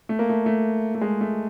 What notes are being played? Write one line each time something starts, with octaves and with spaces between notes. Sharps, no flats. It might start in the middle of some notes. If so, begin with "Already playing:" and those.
A3
A#3
A3
A3
A3
G#3
A3